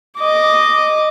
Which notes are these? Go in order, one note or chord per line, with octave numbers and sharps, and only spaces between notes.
D#5 D6